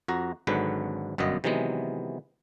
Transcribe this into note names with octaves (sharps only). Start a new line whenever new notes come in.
F2 F#4 A#5
G#1 G#2 D3 F#3 B4
G1 F#2 B2 B3 D#5
C3 D#3 E3 F#3 G#3 B3